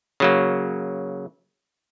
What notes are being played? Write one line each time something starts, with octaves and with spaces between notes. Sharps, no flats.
C#3 F#3 A#3